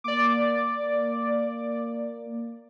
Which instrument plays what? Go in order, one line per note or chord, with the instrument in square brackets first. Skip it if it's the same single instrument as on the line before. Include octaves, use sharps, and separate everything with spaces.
[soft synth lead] A#3 [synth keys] D5 D6